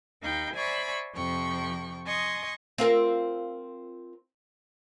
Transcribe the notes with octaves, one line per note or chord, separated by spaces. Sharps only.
D#2 D#4 F5 G5 B5
C5 D5 E5 G#5 B5 C#6
F2 C3 F3 G5 C#6
D#5 G#5 C6 C#6 D#6
C4 F4 A#4